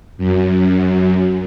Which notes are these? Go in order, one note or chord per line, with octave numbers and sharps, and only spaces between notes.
F#2